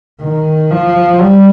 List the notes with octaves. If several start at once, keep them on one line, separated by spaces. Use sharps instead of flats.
D#3
F3
G3